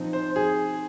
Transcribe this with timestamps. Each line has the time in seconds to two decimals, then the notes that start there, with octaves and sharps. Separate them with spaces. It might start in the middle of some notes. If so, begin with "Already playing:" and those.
Already playing: F3 C4 D#4
0.13 C5
0.36 G#4